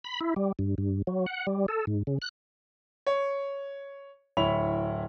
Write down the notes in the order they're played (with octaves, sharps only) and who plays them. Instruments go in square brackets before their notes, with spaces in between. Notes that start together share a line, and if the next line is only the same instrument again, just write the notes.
[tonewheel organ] B5
E4
G3
G2
G2
F#3
F#5
G3
A4
G#2
C#3
F#6
[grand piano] C#5
D1 E4 C#5 B5 F7